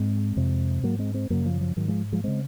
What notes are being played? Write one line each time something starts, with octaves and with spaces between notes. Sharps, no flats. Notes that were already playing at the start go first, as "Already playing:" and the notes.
Already playing: G#2 G#3 C4
F2 C3
G#2 F#3 A#3
G#3 C4
G#3 C4
F#2 C#3 F#3 A#3
F3
F3
G#2 D#3 F#3
F3 G#3
F3 G#3
C#3 G#3 C4